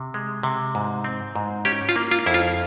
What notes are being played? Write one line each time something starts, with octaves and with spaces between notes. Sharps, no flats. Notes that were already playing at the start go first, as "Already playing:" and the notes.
Already playing: C3
G#3
C3
G#2
C4
G#2
C#4 G4
F4
A#3
F4
F2 E4
F4